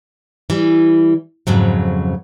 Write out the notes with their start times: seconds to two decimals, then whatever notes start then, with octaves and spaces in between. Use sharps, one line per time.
0.50 E3 G3
1.47 F2 G#2 C#3 F#3